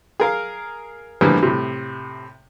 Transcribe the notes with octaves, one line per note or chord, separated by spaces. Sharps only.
G#4 A#4 F5
A2 D3 E3 F3 G3 A#3
A2 C3